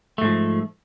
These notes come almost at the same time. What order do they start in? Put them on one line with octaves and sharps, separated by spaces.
A3 G#2 F3